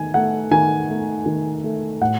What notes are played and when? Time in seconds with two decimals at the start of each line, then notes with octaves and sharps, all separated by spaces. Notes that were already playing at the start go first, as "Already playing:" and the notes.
Already playing: D#3 A3 G#5
0.14 A3 F#5
0.51 D#3 G#5
0.89 A3
1.26 D#3
1.64 A3
2.01 A2 F#5